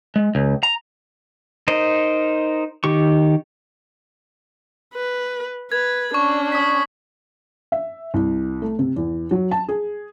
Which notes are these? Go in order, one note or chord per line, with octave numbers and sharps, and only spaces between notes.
G#3
C#2
A#5
D#4 A#4 C5 D#5
D#3 G4 C#6
B4
B4 G#6
C#4 D4 C#6
D#6 B6
E5
C2
A3
C3
E2
F#3
A5
G#4